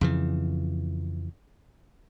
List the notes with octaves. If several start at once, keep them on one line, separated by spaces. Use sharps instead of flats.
F2 C#3 E3